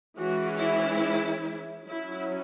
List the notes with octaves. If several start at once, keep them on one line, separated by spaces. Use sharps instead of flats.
E3 G#3 C#4 F#4
E4
F#3 C#4 E4